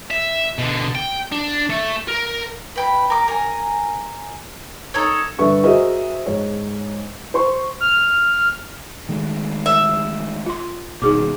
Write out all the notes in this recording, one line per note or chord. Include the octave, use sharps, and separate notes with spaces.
E5
B2 D3
G5
D4
A3
A#4
B4 G5 B5
A#4 D6
A#4 G#5
D#4 A4 C#5
G2 D3 A4 B4 E5 C#6
F#4 G#4 A#4 C5 D#5 E5
G#2 C#5
C5 C6 C#6
F6
D#3 G#3 A3
E5
F4 C6
D#1 G#1 B2 D#4 G#4 D6